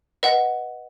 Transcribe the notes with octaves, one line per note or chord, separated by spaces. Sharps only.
B4 D#5 F#5